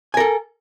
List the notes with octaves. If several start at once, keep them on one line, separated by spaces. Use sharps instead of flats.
A4 A#4 G#5